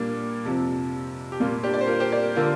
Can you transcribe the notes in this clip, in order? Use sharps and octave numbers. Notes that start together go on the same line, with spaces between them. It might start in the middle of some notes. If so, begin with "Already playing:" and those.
Already playing: A#2 G3 A#3 D4
F2 C3 F3
G4
A#2 G3 A#3 F4
D4 G4
D5
C5
F4 A#4
G4 C5
A#4 D5
D3 A#3 F4 A#4